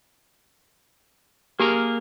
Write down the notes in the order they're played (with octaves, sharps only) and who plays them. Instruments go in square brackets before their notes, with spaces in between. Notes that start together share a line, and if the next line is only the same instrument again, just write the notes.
[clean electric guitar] A#3 G#4 A#4 [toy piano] G4